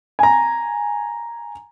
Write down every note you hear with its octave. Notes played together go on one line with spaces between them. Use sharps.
G#5 A#5